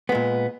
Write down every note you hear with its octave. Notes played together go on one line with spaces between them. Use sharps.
A#2 G#3 B3